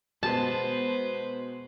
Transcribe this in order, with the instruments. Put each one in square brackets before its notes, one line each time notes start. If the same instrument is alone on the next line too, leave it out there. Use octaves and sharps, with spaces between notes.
[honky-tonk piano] B2 G#3 [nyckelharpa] B4 C5 [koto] A5